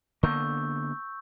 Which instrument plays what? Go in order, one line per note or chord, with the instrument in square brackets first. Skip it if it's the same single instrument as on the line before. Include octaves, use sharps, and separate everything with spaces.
[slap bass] D3 A#3 B3 [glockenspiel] C#6 E6 G6